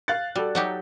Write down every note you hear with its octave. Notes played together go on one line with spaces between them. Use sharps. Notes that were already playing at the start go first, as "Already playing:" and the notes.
F5 F#6 A6
G3 F#4 A4
F#3 D#4 G4